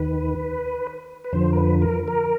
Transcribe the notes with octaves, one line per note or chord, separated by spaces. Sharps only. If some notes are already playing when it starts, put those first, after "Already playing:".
Already playing: D#2 D#3 B4
B4
F2 D3 F3 C5
A#4
B4
A#4
A#4